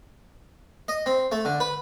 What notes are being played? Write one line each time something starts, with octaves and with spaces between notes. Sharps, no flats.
D#5
C4
A3
D3
B4